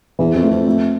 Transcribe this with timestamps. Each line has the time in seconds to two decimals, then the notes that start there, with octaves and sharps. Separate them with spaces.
0.19 E2 E3
0.35 F2
0.43 A3
0.51 F2
0.67 A3